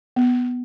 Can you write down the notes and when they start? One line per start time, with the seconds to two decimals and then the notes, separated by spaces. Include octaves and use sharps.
0.16 B3